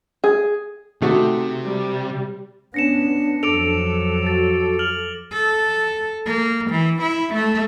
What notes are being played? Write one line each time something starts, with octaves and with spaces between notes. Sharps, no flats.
G#4
C3 D#3 A3 F#4
G3
B3 C#4 D4 A#6 C#7 E7
F2 F#3 A4 D6 D7 F7
F#4 A6
A4 F6 F7 F#7
A4
A#3
E3
E4
A3